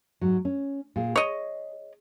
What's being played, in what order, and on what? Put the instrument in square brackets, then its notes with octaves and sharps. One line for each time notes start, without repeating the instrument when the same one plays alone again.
[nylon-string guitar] G#2 F#3
C#4
A#2 G#4
[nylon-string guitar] G#4 [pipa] C#5 D#5